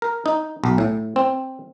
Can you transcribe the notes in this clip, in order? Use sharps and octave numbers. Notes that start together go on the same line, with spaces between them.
A#4
D#4
B1
A2
C4